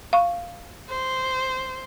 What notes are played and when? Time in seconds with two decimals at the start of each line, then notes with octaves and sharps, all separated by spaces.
0.13 F5 C#6
0.90 C5